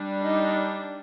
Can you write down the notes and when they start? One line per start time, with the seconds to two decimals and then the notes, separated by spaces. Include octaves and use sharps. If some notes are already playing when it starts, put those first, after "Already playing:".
Already playing: G3 D4
0.24 D#4